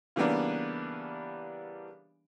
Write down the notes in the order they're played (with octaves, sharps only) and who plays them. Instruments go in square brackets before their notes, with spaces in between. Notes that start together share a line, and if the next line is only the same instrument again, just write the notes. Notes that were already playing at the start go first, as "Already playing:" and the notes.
[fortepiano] C#3 E3 G3 A#3 B3 D4